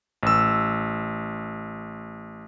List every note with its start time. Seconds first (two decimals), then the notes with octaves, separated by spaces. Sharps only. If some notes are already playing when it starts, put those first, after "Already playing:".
0.23 A1 E6